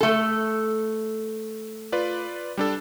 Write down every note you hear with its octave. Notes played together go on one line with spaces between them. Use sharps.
A3 A4
F4 B4 D5
G3 D4 A4